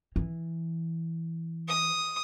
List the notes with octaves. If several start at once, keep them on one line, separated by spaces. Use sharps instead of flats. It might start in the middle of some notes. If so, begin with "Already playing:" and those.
E3
D#6